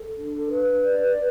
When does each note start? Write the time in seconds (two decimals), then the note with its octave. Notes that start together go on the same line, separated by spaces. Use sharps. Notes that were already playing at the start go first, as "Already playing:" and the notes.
Already playing: A4
0.17 D4
0.50 B4
0.83 D5